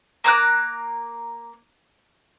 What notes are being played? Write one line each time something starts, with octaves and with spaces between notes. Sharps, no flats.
A#3 A#5 D6 F#6